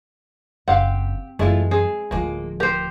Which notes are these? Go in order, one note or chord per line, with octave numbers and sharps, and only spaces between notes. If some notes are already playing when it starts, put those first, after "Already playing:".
F#1 C4 G4 F5 F#5
F#2 E3 G#3 A3 E4 F4
C4 G#4
D1 F3 G#3 A#3
G4 A#4 C5